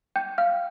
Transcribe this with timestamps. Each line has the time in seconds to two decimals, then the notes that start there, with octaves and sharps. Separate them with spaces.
0.16 G5 G6
0.38 F5 F6